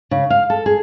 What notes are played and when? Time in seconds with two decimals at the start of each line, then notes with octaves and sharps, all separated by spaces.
0.11 C#3
0.30 F5
0.50 A4
0.66 G#4